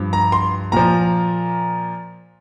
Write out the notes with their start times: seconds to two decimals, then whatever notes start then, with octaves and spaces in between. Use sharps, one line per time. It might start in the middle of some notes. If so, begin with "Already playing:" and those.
Already playing: G2 F3
0.13 A#5
0.32 C6
0.72 A#2 F3 A#5